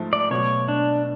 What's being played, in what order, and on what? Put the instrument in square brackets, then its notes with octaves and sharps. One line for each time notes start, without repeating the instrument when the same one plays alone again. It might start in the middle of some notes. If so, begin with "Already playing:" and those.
Already playing: [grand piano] G#2 F3 A3
[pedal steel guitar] D5
[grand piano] B2 F#3 A3 [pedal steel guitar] C#5
[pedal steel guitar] D4